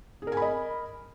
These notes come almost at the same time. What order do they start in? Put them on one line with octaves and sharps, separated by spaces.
G#4 A#4 G#5 B5 D#5